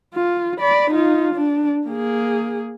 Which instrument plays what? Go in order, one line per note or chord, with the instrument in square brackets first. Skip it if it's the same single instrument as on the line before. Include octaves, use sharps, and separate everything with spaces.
[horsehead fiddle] F4
D5 B5
D#4 F4
D4
A#3 G#4